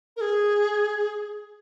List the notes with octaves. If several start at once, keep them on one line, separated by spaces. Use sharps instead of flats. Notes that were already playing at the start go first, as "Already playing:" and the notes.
A#4
G#4